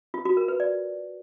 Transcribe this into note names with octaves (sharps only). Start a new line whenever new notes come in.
F4
F#4
A#4
B4
D5